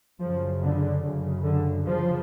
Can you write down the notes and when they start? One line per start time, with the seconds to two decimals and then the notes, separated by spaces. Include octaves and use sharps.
0.20 F#2 C#3 F3
0.61 D3
1.03 F#2 C#3
1.44 D3
1.85 F#2 C#3 F3